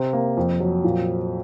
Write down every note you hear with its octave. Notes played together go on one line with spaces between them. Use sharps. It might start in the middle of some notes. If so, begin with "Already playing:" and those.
Already playing: C3
A#3
F2
F#3
A#2